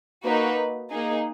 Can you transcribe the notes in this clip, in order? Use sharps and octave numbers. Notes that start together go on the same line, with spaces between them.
A#3 D#4 F#4 B4
A#3 D#4 G#4